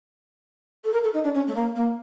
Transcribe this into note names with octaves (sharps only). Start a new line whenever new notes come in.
A4
A#4
A4
D#4
D4
C#4
A3
A#3
A#3